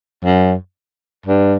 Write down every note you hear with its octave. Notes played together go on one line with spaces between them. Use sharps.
F#2
G2